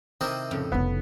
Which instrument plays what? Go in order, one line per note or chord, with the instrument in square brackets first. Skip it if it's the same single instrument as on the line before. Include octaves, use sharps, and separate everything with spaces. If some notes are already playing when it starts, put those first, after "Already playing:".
[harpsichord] C3 D#3 C4 [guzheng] E4 A#4
[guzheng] F2 A2 C#3
[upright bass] F1 D#4 [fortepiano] B3